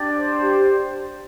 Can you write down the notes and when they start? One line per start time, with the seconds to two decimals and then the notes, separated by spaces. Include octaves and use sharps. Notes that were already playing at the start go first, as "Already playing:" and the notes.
Already playing: D4 G4 D5
0.16 C5
0.40 G4